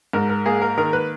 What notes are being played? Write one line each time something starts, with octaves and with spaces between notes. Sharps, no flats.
G#2 A#4
A#4
A#3 G#4
A#4
D#3 A#4
B4